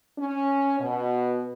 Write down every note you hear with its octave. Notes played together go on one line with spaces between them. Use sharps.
C#4
B2